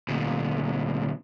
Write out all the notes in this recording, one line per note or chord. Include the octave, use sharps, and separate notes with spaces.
D2 A#2